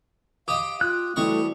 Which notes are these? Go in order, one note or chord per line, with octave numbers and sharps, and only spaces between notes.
G4 D#5 F5 G5 D#6
F4 F#6
E3 G3 A3 C4 F#4 D#5 C#6